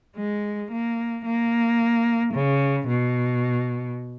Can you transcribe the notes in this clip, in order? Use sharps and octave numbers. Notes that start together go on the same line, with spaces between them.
G#3
A#3
A#3
C#3
B2